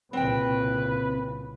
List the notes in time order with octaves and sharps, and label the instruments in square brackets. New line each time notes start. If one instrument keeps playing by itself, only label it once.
[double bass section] C2 A#2 C#3 [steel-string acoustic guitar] C4 G5 [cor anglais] B4